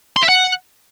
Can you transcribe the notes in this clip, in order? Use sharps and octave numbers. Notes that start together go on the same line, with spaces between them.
C6
E5
F#5